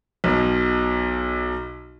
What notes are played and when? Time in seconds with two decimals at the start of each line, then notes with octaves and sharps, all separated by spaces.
0.24 B1 B2